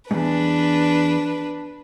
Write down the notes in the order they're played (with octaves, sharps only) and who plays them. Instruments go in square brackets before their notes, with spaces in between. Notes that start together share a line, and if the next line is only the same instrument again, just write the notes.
[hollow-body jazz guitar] E2 G#2 [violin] D4 B4